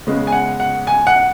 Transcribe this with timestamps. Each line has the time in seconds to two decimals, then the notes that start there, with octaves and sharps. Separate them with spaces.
0.07 C#3 G#3 B3
0.27 G#5
0.32 F#5
0.60 F#5
0.87 G#5
1.07 F#5